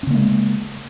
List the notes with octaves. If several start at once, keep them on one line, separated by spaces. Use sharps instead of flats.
C#3 G#3 A#3 C#4